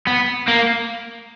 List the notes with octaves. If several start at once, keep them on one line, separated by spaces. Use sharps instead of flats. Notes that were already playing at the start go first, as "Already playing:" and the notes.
B3
A#3